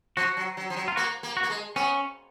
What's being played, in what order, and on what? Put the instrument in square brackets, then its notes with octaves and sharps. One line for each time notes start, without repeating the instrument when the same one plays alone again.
[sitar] F3 [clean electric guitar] F#4
[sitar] F#3
F#3
F3
F#3
[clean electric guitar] F4
[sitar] A#3 [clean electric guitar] F#4
[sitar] A#3
[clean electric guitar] F#4
[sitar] A#3
G#3
[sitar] B3 [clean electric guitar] C#4